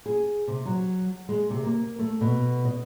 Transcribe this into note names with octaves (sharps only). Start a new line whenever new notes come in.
G#4
C3
F#3
G#3
C3
A#3
A3
B2
D#5